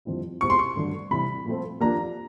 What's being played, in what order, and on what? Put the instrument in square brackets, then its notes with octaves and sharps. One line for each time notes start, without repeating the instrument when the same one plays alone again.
[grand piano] F2 D3 G3 C4 E4
[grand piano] B2 G#3 C4 E4 G4 [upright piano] C#6
[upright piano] C6
C#6
[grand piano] G2 D3 F#3 A3 D4
[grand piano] C3 E3 G3 [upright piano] B5
[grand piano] A#2 F3 A3 C4
[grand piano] F3 A#3 D4 G4 [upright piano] A#5